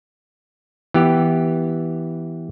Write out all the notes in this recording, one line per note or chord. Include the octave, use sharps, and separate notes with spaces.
E3 B3 G4